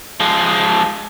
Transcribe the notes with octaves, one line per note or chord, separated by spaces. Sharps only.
F3 G#3